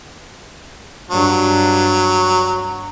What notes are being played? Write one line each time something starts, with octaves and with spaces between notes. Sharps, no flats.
G2 F#3 D4